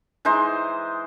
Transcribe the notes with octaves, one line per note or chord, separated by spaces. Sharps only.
E3 G#3 D#4 C5